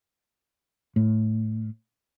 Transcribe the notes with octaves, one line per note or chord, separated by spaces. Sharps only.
A2